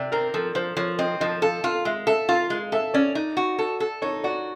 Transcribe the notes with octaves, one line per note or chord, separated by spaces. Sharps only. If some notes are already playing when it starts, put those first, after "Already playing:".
Already playing: C3 D5
C4 A#4
F3 A4
F3 C5
F3 C#5
C4 D#5
F3 D#5
A4 F5
F4 F5
G#3 E5
A4 E5
F4 F5
G#3
A4 E5
C#4 D5
D#4
F#4
A4
A4
D#4 C#5
F#4 D5